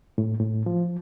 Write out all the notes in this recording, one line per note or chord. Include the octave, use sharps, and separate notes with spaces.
A2
A2
F3